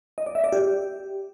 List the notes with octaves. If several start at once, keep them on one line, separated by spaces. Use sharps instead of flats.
D#5
D5
E5
D5
G4